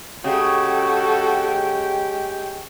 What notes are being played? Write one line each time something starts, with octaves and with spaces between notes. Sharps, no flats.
C#3 G#3 F#4 G4 A4 G5